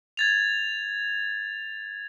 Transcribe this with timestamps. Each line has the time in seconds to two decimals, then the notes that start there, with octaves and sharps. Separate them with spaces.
0.17 G#6 A6 F7